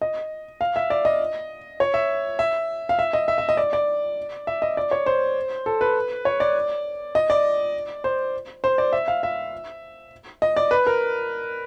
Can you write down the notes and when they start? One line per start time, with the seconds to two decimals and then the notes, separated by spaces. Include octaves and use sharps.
0.02 D#5
0.61 F5
0.76 E5
0.90 D5
1.05 D#5
1.80 C#5
1.94 E5
2.39 E5
2.89 F5
2.99 E5
3.13 D#5
3.28 E5
3.38 E5
3.49 D#5
3.57 D5
3.73 D5
4.47 E5
4.62 D#5
4.77 D5
4.91 C#5
5.06 C5
5.66 A4
5.81 B4
6.25 C#5
6.40 D5
7.15 D#5
7.30 D5
8.04 C5
8.64 C5
8.78 D5
8.93 E5
9.08 F5
9.23 E5
10.42 D#5
10.57 D5
10.71 B4
10.87 A#4